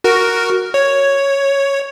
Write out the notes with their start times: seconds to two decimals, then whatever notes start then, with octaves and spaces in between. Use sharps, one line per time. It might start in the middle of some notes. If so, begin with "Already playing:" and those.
0.04 F#4 A#4
0.74 C#5